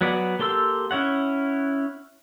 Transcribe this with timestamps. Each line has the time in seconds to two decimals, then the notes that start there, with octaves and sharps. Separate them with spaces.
0.01 F#3 B3 D5
0.39 A#3 G4 A4 C6 E6
0.91 C#4 E4 C#5 F#5